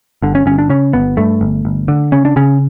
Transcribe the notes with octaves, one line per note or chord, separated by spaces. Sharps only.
G1 D3
C#4
G1 C#4
D4
C#3 C#4
G1 B3
G2 A3
G1
G1
D3
C#3 C#4
D4
C#3 C#4